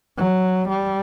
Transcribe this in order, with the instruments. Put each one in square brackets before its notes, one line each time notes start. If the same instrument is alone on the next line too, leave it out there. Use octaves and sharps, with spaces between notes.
[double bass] F#3
G3